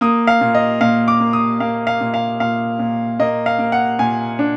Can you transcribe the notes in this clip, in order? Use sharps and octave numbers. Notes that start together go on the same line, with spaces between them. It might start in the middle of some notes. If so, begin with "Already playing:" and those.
A#3 D#6
F5
A#2
D#5
A#2 F5
D6
A#3
D#6
A#3 F5
F5
A#2
F5
A#2 F5
A#2
A#3 D#5
F5
A#3
F#5
A#2 G#5
D4